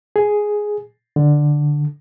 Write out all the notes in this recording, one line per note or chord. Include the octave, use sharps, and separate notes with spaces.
G#4
D3